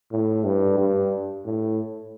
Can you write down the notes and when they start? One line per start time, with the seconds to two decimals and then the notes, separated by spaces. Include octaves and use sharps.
0.11 A2
0.44 G2
0.78 G2
1.45 A2